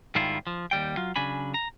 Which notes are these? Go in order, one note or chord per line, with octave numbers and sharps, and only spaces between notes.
G#2 D#3 G3 E4 F4
F3
D#2 C#3 G3 G5
F#3 F4
C#3 F#3 D4 G#5 B5
A#5